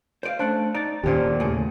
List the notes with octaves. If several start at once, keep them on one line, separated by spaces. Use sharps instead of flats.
C5 D5 F5
A3 C#4 D4 C5 A5 F#6
D#4 D5 A#5 A6
D#2 A#2 D3 C#4 G4 C5
A2 C#3 G#4